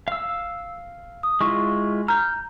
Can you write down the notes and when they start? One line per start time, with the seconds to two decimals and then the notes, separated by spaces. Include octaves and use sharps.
0.08 F5 E6
1.23 D#6
1.41 G#3 E4 F4 C#6
2.08 A#5 F6 G6